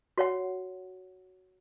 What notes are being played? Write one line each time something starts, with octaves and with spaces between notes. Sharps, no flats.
F#4 C#5 F#5